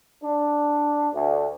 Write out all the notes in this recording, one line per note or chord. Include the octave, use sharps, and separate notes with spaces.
D4
D2